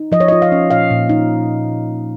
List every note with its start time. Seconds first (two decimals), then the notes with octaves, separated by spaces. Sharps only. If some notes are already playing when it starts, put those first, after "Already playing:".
Already playing: D#4
0.12 F3 D#5
0.20 C#5
0.28 F4 D#5
0.42 F5
0.52 C#4
0.71 A#2 F5
0.91 A#2
1.09 D#4